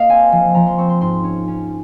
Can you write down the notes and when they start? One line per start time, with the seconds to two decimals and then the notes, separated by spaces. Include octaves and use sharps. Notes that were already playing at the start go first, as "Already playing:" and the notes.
Already playing: A#3 D#5 F5
0.09 C4 G#5
0.32 F3
0.54 F3 A#5
0.66 C6
0.78 C4 C#6
0.89 C6
1.01 G#2 C6
1.24 C#4
1.48 C#4